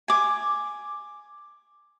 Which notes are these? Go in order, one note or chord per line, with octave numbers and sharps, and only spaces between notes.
G#5 D6